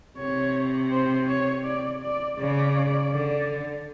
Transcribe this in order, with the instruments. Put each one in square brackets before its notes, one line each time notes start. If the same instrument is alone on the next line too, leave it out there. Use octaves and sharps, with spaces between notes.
[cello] C3 [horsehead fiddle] C#5
[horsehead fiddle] C5
C#5
D5
D5
[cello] C#3 [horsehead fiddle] D5
[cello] D3